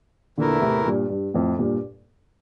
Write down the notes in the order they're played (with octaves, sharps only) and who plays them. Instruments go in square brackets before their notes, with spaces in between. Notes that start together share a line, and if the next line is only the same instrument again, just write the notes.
[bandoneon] E2 E3 A3 E4 A#4 [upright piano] A#2 D3
[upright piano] A2 C3
G2 A#2
G2
F2 A2
G2 A#2